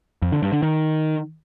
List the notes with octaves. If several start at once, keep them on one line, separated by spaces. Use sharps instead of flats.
F2
D3
G2
D3
D#3